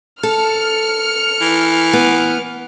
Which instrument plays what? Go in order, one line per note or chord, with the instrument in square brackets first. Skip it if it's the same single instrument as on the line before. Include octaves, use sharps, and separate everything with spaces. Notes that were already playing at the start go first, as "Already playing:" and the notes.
[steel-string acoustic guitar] A4 [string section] F6 C#7
[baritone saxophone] E3
[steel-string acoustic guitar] B3